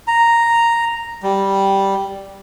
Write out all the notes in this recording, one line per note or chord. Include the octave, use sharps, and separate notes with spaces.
A#5
G3